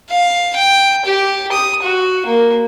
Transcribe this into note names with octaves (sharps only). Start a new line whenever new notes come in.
F5
G5
G4
D#6
F#4
A#3